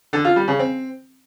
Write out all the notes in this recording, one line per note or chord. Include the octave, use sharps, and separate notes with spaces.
D3
F4
G3
C#3
C4